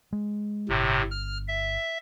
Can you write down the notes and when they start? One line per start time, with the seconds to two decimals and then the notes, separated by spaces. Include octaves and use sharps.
0.13 G#3
0.69 G1 A2 C3
1.11 F6
1.48 E5